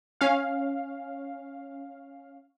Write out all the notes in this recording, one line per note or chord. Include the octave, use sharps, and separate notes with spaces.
C#4 F5